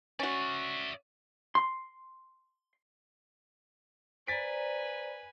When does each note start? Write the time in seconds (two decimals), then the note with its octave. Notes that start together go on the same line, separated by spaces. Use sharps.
0.19 C#4 F#4 D5 E5
1.55 C6
4.27 B4 C5 D5 G#5 A#5 A6 B6 D7